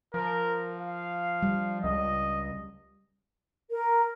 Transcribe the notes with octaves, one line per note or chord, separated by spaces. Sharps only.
F3 A#4
F5
G3
C#2 D#5
A#4